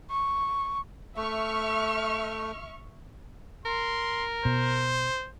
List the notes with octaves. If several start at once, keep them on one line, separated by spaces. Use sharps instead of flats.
C#6
A3 E5 C#6 F6
A#4 C6
B2 C5